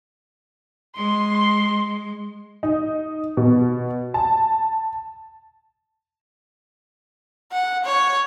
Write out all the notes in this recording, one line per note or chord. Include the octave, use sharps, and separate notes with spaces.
G#3 C6
D#4
B2
A5
F#5
C#5